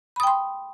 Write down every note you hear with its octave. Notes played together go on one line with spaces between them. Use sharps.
G5 B5 C6 D#6